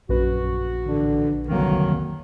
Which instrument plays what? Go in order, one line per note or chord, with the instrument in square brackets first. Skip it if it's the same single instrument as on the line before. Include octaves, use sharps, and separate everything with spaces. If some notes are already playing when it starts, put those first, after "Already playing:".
[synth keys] A#1 B4 [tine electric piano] F#2 [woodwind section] F#4
[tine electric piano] A1 D4 [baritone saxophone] D3
[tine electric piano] C2 F2 A#3 [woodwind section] D3 D#3 [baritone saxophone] F#3